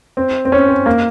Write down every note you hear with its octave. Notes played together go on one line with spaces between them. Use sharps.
C4
C4
C#4
C4
A#3